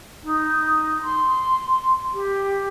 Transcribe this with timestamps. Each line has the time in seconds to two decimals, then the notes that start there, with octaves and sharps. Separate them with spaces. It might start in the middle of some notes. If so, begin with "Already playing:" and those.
0.23 D#4
1.02 C6
2.13 G4